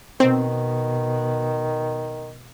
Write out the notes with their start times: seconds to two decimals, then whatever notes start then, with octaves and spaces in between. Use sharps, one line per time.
0.20 B2 D#3 C4